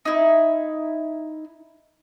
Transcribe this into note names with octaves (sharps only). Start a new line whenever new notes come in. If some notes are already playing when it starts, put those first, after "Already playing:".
D#4 E4